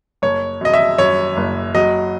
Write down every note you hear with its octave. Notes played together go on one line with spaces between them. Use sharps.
F#1 C#5
F#2 D#5
E5
F#2 C#5
F#1
F#3 D#5